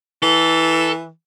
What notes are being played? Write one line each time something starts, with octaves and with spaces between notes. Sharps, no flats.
E3 A4